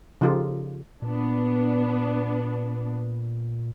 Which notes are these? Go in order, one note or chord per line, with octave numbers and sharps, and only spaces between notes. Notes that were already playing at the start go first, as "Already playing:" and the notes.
C#3 F3 D#4 F4 G4 A4
A#2 B3 D4